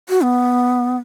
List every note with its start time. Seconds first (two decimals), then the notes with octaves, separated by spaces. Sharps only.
0.09 F#4
0.23 B3